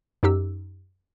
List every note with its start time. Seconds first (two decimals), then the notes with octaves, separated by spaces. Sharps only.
0.23 F#2 D#4 G4 E6